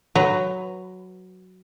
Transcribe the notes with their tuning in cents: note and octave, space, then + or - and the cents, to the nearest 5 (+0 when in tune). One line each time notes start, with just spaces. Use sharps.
F#3 +0 B4 +15 A#5 +0